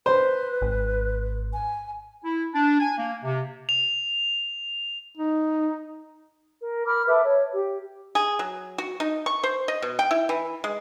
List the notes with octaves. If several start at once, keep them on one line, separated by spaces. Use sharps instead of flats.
B4 C5
G#1
G#5
E4
D4
G#5
A#3
C3
F7
D#4
A#4
A#4 B5 D6 F6
A4 B4 E5 D6
C#5
G4
G#4
F#3
F#4
D#4
C#6
C5
D#5
B2
G5
E4
E3
G#3